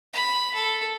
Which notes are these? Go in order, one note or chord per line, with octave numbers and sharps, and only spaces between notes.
B5
A4